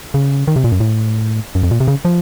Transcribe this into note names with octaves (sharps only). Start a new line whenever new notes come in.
C#3
D#3
C3
A#2
F#2
A2
F#2
F2
A#2
C3
C#3
F3